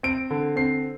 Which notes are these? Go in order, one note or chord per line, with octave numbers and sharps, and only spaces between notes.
C4 D7
D3
C4 C7